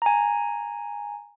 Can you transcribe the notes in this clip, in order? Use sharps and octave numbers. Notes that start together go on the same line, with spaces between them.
G#5 A#5